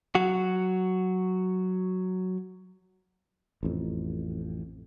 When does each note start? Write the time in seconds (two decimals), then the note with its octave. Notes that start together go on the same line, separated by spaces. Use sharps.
0.15 F#3 F#4
3.63 A1 F2